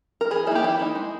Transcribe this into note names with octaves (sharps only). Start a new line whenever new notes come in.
A#4
E3 G#4
A#3 D#4 E4 G4
E3 E4
A#3 D#4
G#3